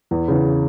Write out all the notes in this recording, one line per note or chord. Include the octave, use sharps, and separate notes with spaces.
E2
C#3 E3